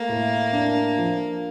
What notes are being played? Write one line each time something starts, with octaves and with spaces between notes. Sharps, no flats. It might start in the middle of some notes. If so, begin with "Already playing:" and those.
Already playing: A3 A#3
A2
D4
F3